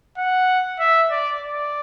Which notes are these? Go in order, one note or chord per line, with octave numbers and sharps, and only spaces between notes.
F#5
E5
D5
D5